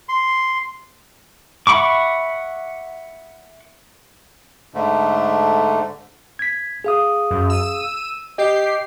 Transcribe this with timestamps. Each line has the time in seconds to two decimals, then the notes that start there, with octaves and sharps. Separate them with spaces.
0.09 C6
1.67 E5 F#5 B5 C#6 D6
4.74 G#2 D3 A3
6.39 G#6 B6
6.84 G#4 F5 D#6
7.31 F#2
7.50 E6 D#7
8.38 G4 D#5 C7